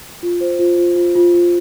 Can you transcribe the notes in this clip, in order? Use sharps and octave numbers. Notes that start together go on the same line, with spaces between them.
F4
C5
F4
F4
F4
F4
F4